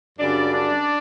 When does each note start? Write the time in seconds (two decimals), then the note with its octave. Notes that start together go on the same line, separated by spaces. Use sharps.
0.18 F#2 C#3 G3 D4 D5
0.52 D4 D5